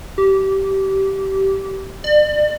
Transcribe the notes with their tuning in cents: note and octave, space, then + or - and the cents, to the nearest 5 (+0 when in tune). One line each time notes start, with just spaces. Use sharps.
G4 -20
D5 +35